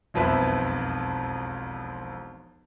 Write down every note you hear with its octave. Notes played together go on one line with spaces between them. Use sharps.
E1 B1 F2 C4 B4 E5